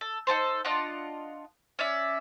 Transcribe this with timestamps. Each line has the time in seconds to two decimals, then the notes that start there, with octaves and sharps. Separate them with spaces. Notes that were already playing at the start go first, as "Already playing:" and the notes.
0.01 A4
0.27 D#4 E4 A4 C5
0.65 D4 F4 D#5 F#5
1.79 C#4 D5 E5